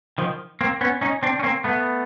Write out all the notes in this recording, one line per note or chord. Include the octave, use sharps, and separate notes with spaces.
D#3 F3
A#3 C4
B3 C#4
C#4 D#4
C4 D4
C#4
A#3 C4
A3 B3